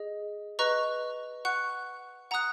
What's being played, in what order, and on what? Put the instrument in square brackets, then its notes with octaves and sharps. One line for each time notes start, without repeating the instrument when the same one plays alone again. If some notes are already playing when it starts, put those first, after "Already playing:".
Already playing: [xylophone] G#4 D#5
B4 D#5 A#5 C#6 F#6
F#5 C#6 F#6
F#5 A#5 D#6 F#6